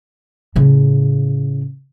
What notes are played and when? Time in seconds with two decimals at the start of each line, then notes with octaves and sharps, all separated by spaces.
0.56 A2 C#3